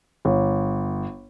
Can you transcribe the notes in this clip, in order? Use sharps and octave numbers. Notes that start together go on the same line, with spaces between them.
G1